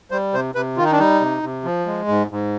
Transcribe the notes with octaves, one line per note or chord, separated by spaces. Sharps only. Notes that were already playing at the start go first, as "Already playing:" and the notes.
G3 C5
C3 C5
C3 B4
D#3 F4
D#4
D4
G3 D#4
C3
C3
F3
G#3
G#2
G#2